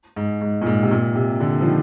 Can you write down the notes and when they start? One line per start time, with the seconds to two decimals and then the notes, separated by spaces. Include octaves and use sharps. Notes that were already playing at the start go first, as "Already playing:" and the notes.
0.16 G#2
0.41 G#2
0.62 A#2
0.66 G#2
0.83 C3
0.91 A#2
1.16 C3
1.40 D3
1.61 F3
1.66 D#3